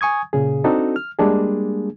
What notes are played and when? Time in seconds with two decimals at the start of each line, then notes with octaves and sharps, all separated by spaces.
0.01 G#5 C#6 D#6 G#6
0.33 A#2 C#3 G#4
0.64 C4 D4 D#4 F#4 A4
0.96 F6
1.19 G3 G#3 A#3 D4 G#4